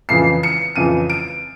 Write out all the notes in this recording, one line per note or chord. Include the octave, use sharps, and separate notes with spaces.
F2 C#3 E3 C7
C#7
F2 C#3 E3 D#7
D7